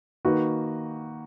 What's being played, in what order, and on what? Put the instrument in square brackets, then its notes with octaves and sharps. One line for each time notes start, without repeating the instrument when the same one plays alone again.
[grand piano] D#3 A#3 D#4 F#4 B4